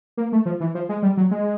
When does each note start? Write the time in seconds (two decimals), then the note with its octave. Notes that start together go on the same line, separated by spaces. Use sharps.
0.17 A#3
0.32 A3
0.46 F3
0.60 E3
0.75 F3
0.89 G#3
1.03 G3
1.17 F#3
1.31 G#3